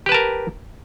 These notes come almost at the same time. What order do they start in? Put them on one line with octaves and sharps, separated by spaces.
G4 B4 A5 A#4